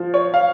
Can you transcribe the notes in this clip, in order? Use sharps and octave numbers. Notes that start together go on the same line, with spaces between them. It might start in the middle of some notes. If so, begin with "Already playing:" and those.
Already playing: F3
C#5
F5